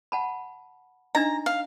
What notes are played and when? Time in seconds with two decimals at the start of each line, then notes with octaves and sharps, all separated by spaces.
0.12 F#5 A5 B5
1.15 D4 D#4 D#5 A#5
1.46 F5